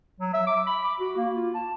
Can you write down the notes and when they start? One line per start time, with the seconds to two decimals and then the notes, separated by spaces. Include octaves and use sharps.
0.20 F#3
0.34 E5
0.47 D6
0.67 B5
0.84 D6
0.99 F#4
1.17 A#3
1.35 F4
1.54 A5